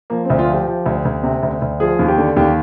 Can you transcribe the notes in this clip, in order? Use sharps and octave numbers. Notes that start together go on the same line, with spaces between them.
F3 A#3
D2 C4
F4
F3
G4
F3
D2
D2
C3
D2
D2
F3 G#4
D#2
G4
D3
D#2 G4